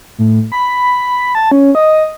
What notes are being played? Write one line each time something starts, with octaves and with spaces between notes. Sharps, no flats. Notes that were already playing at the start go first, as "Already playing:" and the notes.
A2
B5
A5
C#4
D#5